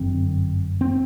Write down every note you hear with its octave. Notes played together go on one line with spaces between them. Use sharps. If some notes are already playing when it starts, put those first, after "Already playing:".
Already playing: G1 F#2 D3 C4
C4